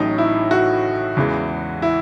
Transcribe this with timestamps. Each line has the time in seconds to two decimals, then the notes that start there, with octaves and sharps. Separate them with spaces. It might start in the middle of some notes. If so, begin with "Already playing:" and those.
Already playing: A1 A2 F#3 D#4
0.18 E4
0.51 F#4
1.17 E2 C#3 E3 G#3
1.82 E4